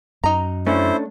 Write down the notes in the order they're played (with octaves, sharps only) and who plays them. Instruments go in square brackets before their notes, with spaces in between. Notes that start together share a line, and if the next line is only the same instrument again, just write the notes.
[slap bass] F#2 [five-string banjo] D#4 A#5
[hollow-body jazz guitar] A3 C#4 D4 [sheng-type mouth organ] E4 C5